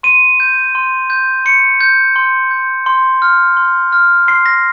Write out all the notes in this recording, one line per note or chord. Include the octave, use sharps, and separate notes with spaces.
C6 D#7
G6
C6
G6
C6 C#7
G6
C6
G6
C6
F6
C6
F6
C6 C7
A#6